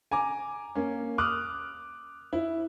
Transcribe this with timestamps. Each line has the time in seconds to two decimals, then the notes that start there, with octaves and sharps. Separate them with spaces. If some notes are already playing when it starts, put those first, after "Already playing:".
0.11 G#5 A#5 D6
0.75 A#3 C#4
1.18 D6 D#6 F6 F#6
2.33 E4